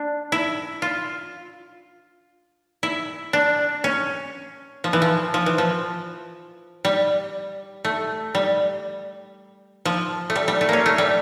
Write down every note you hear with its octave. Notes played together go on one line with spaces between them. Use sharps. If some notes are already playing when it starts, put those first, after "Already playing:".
Already playing: D4
E4
F4
E4
D4
C#4
F3
E3
F3
F3
E3
F3
G3
A3
G3
F3
A3
G3
G3
A3
A#3 C#4
A3
G3